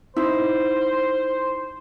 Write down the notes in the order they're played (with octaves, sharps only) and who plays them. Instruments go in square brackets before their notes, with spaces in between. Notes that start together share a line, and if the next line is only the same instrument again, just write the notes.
[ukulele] D#4 E4 [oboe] C5